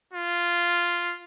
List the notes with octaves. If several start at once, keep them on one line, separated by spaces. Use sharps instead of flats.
F4